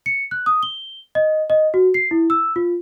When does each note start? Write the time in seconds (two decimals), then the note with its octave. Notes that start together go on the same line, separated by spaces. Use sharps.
0.06 C#7
0.31 F#6
0.46 D#6
0.63 G7
1.15 D#5
1.50 D#5
1.74 F#4
1.94 C7
2.11 E4
2.30 E6
2.56 F4